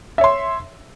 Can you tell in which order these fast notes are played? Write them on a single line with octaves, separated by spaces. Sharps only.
E5 C#5 C6